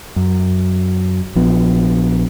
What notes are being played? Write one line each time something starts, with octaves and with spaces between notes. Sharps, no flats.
F#2
A#1 F3 B3